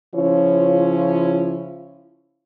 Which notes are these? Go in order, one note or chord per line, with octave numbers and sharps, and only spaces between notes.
C#3 F3 C#4 E4 F4 C#5